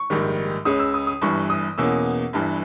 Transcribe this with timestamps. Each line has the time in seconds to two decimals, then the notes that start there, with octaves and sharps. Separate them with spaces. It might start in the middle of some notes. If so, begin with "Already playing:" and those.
Already playing: C#6
0.10 A#1 G#2 D#3 G3
0.65 C#2 C#3 G#3 C#4 D#6
0.79 E6
0.94 D#6
1.07 D#6
1.22 G1 G2 E3 C#6
1.50 D#6
1.78 E2 B2 A#3 C#4 E6
2.33 G1 G2 E3